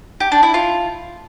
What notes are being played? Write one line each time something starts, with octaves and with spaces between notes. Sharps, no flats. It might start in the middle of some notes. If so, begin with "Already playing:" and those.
G4
D4
E4
F4